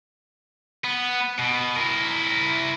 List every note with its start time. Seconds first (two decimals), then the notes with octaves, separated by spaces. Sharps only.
0.84 B3
1.39 B2
1.76 E4 A#4